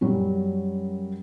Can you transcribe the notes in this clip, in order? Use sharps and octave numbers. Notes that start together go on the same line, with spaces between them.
F#2 F#3 G3 C#4